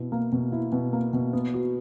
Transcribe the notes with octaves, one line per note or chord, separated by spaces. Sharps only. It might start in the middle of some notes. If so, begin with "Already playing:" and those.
Already playing: B2 E4
A#3
B2
E4
B2
A#3
B2
B3
F#4